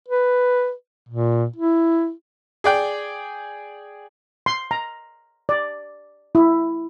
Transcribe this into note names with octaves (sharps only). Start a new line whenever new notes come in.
B4
A#2
E4
G#4 D5 G5
C6
A#5
D5
E4